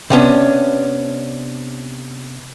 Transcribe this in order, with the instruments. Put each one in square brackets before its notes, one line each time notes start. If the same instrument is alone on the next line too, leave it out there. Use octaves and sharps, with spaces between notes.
[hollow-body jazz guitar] C3 B3 C#4 D4